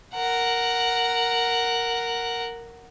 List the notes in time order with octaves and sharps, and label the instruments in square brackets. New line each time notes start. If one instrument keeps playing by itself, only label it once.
[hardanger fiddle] A#4 F#5